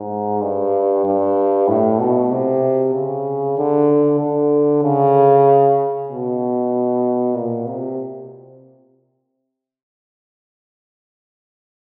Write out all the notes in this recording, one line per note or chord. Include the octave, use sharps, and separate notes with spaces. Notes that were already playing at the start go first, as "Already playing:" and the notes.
Already playing: G#2
G2
G2
A2
B2
C3
C#3
D3
D3
C#3
B2
A#2
C3